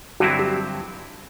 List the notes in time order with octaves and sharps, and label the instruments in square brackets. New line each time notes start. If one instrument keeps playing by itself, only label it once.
[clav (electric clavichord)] G2 D3 F#3 C4 E4 [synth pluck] F#4
[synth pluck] G4